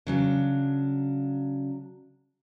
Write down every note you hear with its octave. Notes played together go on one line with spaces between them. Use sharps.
C#3 F#3 D4